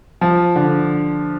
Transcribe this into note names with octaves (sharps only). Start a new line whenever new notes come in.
F3
D3